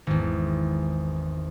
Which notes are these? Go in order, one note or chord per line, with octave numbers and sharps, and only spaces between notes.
G#1 E2